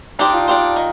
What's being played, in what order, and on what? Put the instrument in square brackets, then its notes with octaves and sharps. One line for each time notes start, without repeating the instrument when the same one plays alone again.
[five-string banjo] D4 G4 C5 [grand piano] D#4
[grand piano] F4
[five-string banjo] D4 G4 C5
D#3